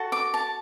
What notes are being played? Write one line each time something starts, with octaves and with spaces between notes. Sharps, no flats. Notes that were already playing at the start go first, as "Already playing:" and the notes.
Already playing: F#4 A4
D6
A5